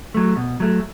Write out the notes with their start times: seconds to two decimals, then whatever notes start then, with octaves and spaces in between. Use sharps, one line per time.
0.14 F#3 A3
0.37 B2
0.60 F#3 A3